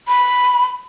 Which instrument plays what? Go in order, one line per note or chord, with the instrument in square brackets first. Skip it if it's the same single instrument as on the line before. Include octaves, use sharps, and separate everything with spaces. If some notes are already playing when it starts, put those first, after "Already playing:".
[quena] B5